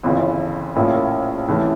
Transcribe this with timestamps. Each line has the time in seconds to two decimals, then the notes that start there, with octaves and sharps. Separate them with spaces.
0.03 G1 F2 C#3 E3
0.75 A#1 A2 F3 A#3 C#4
1.48 C2 C3 E3 A3 C#4